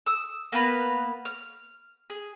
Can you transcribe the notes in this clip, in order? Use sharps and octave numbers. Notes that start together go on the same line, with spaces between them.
D#6 E6
A#3 B3 B4 A#5
F6
G#4